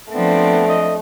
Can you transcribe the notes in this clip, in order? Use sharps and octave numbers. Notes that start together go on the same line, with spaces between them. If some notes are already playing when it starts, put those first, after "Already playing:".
F3 A3 B3 C4 D4
D#5